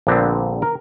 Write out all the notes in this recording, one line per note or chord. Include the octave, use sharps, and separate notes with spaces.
A#1 A#2 D3 B3 C4
A#4